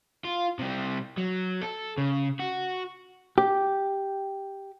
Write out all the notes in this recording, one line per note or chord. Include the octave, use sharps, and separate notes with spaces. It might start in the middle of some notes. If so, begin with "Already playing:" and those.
F4
C3 G3
F#3
A4
C#3
F#4
G4